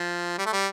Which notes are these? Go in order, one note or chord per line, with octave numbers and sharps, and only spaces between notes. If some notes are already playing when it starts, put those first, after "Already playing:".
Already playing: F3
G3
A3
G3